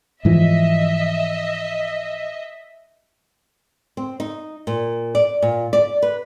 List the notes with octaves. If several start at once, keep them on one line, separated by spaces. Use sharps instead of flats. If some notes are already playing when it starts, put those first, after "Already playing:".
G#2 E3 F3 D#5 E5
C4
D#4
A#2
D5
A#2
D5
B4